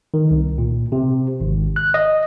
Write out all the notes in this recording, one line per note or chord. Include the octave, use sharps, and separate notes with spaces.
D#3
C2
A#2
C3
G#1
F#6
D#5